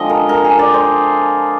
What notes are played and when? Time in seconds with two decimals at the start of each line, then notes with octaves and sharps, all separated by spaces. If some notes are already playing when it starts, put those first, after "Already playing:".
Already playing: D3 F3 G#3 C4 D#5
0.10 A#4
0.29 A#4
0.44 G#4
0.59 D5
0.74 C5